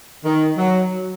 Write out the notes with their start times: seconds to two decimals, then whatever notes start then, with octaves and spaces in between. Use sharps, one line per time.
0.24 D#3
0.58 F#3